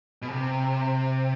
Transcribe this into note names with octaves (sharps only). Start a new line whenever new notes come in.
B2
C3